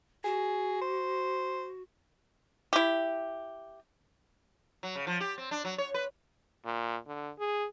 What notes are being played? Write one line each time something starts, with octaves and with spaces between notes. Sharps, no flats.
F#4 G#4
C5
E4 G4
F#3
C#3
F3
G4
C4
D4
F#3
C#5
B4
A#2
D3
G#4